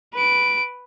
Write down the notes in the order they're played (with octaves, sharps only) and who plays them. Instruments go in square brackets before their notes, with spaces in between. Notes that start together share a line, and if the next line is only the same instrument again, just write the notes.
[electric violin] B4 D7